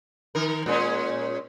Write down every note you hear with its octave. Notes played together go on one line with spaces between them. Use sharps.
D#3 A#4
A#2 G#3 C#4